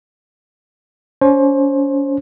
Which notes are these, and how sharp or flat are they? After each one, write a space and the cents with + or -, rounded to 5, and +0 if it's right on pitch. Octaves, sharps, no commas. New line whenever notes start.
C#4 +35 C5 +30